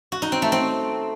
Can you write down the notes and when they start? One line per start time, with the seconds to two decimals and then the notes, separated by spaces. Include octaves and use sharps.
0.12 F#4
0.22 D#4
0.32 C4
0.42 A3
0.52 C4